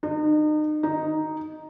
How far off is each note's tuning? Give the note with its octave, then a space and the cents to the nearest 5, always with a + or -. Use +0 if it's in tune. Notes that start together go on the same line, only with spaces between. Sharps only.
D#4 -35
D#4 +0